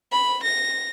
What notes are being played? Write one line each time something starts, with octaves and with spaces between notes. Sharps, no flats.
B5
A#6